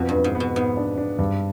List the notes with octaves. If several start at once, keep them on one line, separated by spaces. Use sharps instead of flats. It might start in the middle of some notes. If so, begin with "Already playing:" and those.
Already playing: F2 B2
G2
F2
G#2
B3
B2
G#2 B3
D4
D4
G2